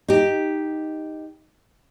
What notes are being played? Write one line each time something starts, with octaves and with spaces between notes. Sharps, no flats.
D#4 G4